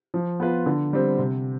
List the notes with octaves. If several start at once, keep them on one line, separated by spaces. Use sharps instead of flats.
F3
B3 F4 B4
D3
G3 C4
C3